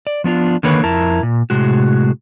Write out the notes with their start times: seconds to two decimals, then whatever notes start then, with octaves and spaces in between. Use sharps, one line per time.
0.07 D5
0.24 F3 B3 D4 F4
0.63 D3 D#3 A#3 B4 C#5
0.84 F2 E4 A#4 A5
1.23 A#2
1.50 A2 C3 G#3 F#4